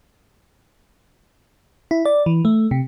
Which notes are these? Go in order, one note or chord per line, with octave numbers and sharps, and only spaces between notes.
E4
D5
E3
A3
C3